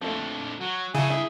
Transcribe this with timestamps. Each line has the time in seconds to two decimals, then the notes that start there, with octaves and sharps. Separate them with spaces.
0.01 F2 D3 F3 A3
0.61 F#3 F#4
0.95 C#3 F3 E4 F#4 A4 G#5
1.10 G2 E4 G#4 E5